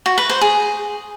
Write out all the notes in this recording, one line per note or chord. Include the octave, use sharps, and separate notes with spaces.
F#4
B4
C5
G#4